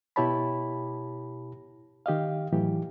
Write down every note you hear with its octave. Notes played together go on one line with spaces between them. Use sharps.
B2 E4 G4 C#5 A5 B5
D#3 G4 D#5 F5
A2 E3 F#3 G4